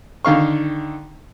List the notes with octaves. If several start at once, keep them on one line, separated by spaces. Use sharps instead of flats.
D3 D#3 F5 C#6